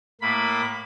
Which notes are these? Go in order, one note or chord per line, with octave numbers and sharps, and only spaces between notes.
A2 A#3 B5